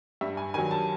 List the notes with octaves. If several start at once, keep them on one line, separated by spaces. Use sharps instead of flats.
G2 E5
G#5
D#3 F#3 G#5
A5